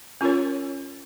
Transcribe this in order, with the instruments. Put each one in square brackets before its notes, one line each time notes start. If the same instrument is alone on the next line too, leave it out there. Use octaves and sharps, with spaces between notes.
[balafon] C#4 F4 A#4 C#5